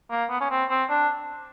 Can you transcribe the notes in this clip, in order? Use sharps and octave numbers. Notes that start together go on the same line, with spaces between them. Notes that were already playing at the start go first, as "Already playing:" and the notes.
A#3
B3
C#4
C4
C4
D4